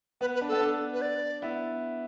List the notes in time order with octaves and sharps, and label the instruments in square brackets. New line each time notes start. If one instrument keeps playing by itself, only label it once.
[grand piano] B3 [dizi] B4
[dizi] B4
[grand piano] D4
[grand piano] B3 [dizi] A4
[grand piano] D4
[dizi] B4
D5
[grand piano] B3 E4